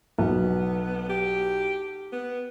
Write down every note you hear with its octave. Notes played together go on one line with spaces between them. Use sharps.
B1 B3
G4
B3